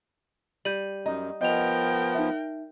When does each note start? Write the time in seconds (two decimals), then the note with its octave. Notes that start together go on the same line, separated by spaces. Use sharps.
0.65 G3 G6 D#7 F#7
1.06 F#2 D#4
1.41 F3 B3 A#4 D#5 F#5 G5 F7
2.15 D#4 E5